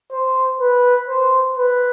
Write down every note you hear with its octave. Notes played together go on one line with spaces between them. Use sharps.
C5
B4
C5
B4